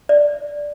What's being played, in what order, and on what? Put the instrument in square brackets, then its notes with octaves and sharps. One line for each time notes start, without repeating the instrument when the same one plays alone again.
[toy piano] D5